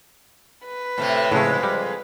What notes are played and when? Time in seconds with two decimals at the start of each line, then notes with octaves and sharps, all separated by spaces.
0.65 B4
0.98 A2 C3 A3
1.31 F2 A2 C#3 G#3 A3
1.63 G3